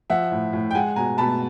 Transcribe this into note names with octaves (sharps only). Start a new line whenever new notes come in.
F3 E5 F#5
A2
A2
G5
G#3 F#5 G#5
B2 G#5 A#5
B2 A5 B5